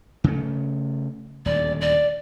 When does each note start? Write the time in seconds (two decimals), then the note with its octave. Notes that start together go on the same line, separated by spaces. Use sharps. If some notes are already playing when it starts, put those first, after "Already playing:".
0.24 C#3 A3
1.46 D#1 D2 D5
1.81 D5